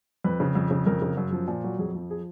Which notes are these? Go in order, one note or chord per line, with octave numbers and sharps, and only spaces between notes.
F2 B4
C#3
F2
C#3
F2 A#4
C#3
F#2
F3
A#2
F#3
F2 G#4
F3
G#4